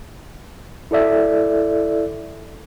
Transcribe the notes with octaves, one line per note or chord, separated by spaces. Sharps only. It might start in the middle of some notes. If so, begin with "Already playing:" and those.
E4 A4 D5 E5